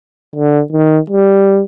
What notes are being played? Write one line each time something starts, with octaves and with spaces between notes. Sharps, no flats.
D3
D#3
G3